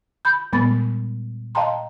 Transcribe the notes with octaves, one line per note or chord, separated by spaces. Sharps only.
B5 G6
A#2 G3 G#3 B3 B5 A6
D#5 F5 G5 A5 A#5 C6